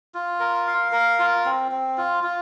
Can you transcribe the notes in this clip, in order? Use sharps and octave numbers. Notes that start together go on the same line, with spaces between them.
F4
A#4
F5
A#4
F4
C4
C4
F4
F4